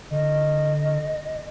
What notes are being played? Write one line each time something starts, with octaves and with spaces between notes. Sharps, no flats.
D3 D#5